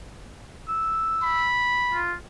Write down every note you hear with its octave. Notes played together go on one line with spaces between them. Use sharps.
E6
B5
F4